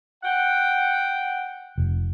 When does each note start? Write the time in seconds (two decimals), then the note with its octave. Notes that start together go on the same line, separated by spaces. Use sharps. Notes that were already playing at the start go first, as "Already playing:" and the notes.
0.23 F#5 G5
1.78 F1